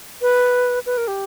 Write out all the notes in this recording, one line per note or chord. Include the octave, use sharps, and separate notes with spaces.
B4
B4
A#4
G4